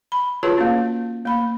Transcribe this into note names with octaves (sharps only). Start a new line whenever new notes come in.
B5
F4 F#4 G#4 B4 C#5 A5
A#3 C#4
A#3 B5